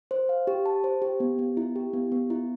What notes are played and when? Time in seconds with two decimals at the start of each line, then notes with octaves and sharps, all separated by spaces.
0.11 C5
0.29 F5
0.47 G4
0.66 A5
0.84 C5
1.02 G4
1.20 B3
1.39 B3
1.57 E4
1.76 G4
1.93 B3
2.12 B3
2.30 E4